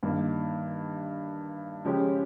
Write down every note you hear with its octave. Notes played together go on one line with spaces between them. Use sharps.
G2 D#3 A#3
C#3 F3 G#3 C#4 G4